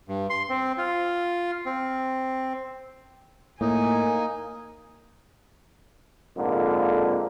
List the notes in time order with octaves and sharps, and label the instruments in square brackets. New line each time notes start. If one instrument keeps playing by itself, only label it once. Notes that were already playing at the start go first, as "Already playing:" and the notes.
[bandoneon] G2
C6
C4
F4
C4
[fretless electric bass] A2 [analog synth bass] A#3 [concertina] D#4 [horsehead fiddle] G#5
[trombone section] F2 G#2 D3 A#3